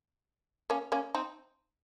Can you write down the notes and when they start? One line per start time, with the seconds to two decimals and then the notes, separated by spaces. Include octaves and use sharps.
0.70 A#3 C#4
0.92 A#3 C#4
1.15 C4 D#4